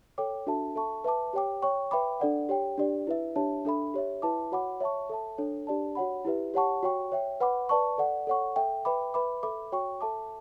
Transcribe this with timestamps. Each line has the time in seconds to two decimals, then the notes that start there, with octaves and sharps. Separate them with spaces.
0.18 A4 C#5 G5 D6
0.47 D4 F#4 A4 E5 A5
0.76 A4 E5 A5 C#6
1.04 B4 E5 A5 D6
1.33 G4 C#5 G5 D6
1.62 C#5 G5 C#6
1.91 B4 E5 G5 B5 D6
2.20 D4 A4 D5 F#5
2.49 G4 C#5 G5
2.78 D4 G4 D5
3.07 E4 B4 E5
3.36 D4 G4 C#5 E5 A5
3.65 D4 A4 E5 B5
3.94 G4 C#5 E5
4.22 E4 B4 E5 A5 D6
4.52 F#4 C#5 F#5 B5 D6
4.80 C#5 E5 A5 C#6
5.10 A4 E5 A5
5.38 D4 A4 C#5
5.67 D4 G4 D5 A5
5.95 F#4 C#5 F#5 B5
6.25 E4 G4 B4 E5
6.54 G4 C#5 F#5 A5 C#6
6.83 F#4 C#5 G5 C#6
7.12 C#5 E5 G5
7.40 B4 F#5 B5 D6
7.69 B4 D5 A5 C#6
7.98 A4 D5 F#5
8.27 A4 C#5 F#5 C#6
8.56 A4 E5 G5
8.85 B4 E5 G5 B5 D6
9.14 B4 E5 B5 D6
9.43 A4 E5 B5 D6
9.72 F#4 C#5 G5 C#6
10.01 A4 E5 A5 D6